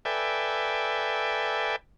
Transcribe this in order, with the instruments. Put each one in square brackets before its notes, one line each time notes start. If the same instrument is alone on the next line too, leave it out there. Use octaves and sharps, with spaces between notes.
[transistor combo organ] A4 B4 D5 E5 G5 G#5